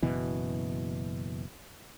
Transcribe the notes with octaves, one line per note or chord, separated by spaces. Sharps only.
F#1 B2 E3